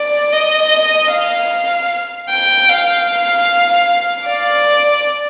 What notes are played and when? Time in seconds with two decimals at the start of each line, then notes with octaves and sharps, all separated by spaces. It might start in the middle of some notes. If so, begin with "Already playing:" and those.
Already playing: D5
0.32 D#5
1.12 F5
2.30 G5
2.69 F5
4.27 D5